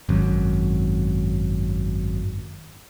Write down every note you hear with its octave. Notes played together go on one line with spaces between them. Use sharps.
G#1 F#2